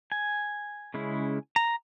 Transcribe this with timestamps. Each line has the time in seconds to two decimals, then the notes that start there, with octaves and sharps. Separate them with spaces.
0.12 G#5
0.94 C#3 G#3 C#4 E4
1.56 A#5